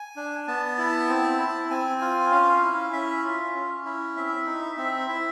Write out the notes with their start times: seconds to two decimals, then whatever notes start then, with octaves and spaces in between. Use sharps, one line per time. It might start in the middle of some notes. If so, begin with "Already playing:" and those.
Already playing: G#5
0.16 D4
0.47 B3 A5
0.78 E4
1.09 C4
1.39 E4
1.70 C4 G#5
2.01 F4
2.31 C#4 F5
2.63 E4
2.93 C#4 E5
3.24 F4
3.55 C#4
3.85 E4
4.16 C4 E5
4.46 D#4
4.78 C4 E5
5.08 E4